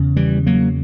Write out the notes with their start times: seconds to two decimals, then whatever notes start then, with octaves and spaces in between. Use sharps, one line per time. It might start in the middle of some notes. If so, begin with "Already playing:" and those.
Already playing: E2 C#3
0.16 E3 G3
0.46 F#3 A#3